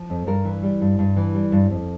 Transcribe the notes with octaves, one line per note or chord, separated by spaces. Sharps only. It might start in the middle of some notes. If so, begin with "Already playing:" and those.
Already playing: F3
F2
G2 A#4
E3
G3
G2
G2
E3
G3
G2
F2